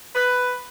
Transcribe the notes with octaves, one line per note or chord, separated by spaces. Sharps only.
B4